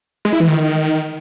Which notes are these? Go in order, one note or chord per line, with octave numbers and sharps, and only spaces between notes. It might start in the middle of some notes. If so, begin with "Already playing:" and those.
G#3
E4
E3
D#3